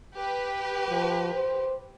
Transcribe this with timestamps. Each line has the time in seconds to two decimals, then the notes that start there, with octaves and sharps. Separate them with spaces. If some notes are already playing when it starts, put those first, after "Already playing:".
0.15 G4 B4
0.90 F3
1.34 C5